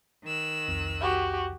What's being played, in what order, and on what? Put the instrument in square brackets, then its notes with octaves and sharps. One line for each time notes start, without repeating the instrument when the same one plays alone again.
[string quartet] D#3 E6 F#6
[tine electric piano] C2 F2
[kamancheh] F#4 G4